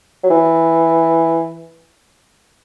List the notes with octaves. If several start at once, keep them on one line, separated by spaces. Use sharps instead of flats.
F#3
E3